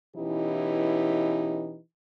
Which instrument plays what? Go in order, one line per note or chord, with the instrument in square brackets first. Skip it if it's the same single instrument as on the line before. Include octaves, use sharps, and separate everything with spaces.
[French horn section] B2 E3 C#4 D#4 E4 G4